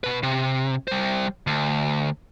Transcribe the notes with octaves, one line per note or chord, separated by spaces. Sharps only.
B2 B4
C3
G3 C5
D2